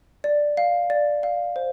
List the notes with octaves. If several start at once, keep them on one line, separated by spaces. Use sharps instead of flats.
D5
F5
D5
F5
C5